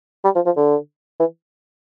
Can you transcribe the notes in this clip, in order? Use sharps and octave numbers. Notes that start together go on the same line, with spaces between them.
G3
F3
F3
D3
E3